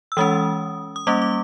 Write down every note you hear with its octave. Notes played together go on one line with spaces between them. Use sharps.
E6
E3 G#3 C#4 D#6
D#6
G3 A#3 C#4 D6
D6